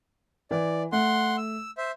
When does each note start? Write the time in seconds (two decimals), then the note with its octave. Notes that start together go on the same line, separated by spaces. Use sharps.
0.51 E3 D5
0.92 A3 F#5 C6
1.38 E6
1.78 C5 E5